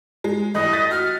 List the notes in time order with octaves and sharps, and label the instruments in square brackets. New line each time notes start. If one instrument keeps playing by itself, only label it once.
[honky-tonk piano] G#3
[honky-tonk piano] G2 E3 A3 [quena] D#5
[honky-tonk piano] G6 A6 B6
[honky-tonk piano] F#4 [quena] F6
[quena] F6